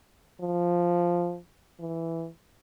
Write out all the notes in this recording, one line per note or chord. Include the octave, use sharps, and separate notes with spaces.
F3
E3